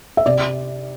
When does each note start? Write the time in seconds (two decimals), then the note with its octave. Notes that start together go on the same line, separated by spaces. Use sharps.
0.17 E5
0.26 C3 D5